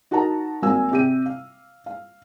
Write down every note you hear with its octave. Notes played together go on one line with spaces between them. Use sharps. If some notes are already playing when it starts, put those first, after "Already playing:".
D#4 F#4 A#4 A5 A#5
G#1 A#3 F#4 F5 G#5 E6
C3 G4 D#7
F5
F5